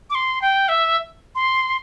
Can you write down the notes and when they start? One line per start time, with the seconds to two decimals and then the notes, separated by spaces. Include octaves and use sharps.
0.10 D6
0.15 C6
0.42 G5
0.68 E5
1.35 C6